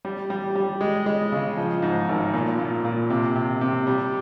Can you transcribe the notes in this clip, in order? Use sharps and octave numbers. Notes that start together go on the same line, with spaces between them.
G3
G3
G3
G#3
G#3
C#3
F3
G#2
G#1
A#2
A#2
A#2
C3
C3
C3
G3